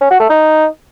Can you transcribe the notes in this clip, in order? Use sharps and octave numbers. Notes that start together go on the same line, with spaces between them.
C#4
F#4
A3
D#4